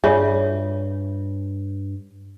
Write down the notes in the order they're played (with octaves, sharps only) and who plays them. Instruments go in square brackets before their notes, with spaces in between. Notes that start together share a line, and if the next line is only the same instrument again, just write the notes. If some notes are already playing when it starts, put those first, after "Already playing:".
[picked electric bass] G2 [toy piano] F4 C#5 E5 [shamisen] G#4 D5